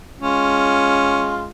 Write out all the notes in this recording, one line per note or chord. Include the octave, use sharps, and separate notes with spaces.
G#3 C#4 F4